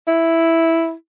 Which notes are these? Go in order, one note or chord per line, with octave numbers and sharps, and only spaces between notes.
E4